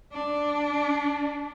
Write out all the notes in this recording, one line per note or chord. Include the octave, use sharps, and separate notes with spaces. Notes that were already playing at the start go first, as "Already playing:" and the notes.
D4